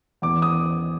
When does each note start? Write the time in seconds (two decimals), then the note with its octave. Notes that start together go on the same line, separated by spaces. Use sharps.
0.22 E2 D6
0.42 D#6